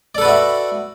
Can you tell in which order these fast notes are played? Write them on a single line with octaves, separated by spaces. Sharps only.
D5 A4 B4 F#4 E5